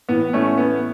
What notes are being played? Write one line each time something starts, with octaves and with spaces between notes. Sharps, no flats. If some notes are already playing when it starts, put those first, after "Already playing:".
A2 E3 B3
A3 C#4
B3